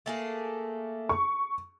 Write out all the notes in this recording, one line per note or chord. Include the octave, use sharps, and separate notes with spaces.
A3 A#3 G#4
C#6